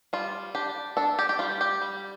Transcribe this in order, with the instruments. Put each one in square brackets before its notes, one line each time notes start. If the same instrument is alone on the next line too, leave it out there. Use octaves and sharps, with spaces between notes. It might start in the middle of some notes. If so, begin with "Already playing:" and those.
[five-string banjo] G3 F4
D4 G4
D4 A4
G4
G4
G3 F4
G4
G3